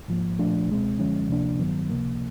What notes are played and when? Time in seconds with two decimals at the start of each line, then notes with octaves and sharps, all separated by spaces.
0.08 G#2 F3 A#3
0.39 A#2 F3 A3 D4
0.69 C#2 B2 G#3 C4
0.99 F#2 D3 F3 G#3 C#4
1.30 D2 C3 F3 A#3 D4
1.59 G2 D#3 F#3 B3
1.90 C#2 C3 F3 A#3